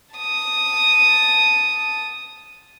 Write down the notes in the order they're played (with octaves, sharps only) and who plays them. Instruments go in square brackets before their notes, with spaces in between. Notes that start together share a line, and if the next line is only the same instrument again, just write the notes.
[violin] A5 D#6